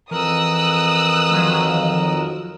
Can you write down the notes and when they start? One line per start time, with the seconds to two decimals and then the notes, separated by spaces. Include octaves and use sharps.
0.11 F2 E3 A#4 D#6 E6 F#6
1.30 D#3 F3 F#3